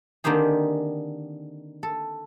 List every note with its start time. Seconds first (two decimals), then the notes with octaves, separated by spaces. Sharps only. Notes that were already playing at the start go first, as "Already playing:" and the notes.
0.24 D3 D#3 A#3 C4 G4 G#4
1.83 A4